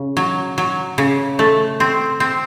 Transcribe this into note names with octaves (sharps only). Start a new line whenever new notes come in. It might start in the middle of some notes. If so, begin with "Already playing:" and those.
Already playing: C#3
F#3
F#3
C#3
A3
C4
C4